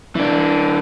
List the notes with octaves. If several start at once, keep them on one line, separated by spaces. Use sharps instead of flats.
E3 D4